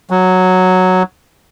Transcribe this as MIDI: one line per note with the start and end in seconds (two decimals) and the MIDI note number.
0.10 1.03 54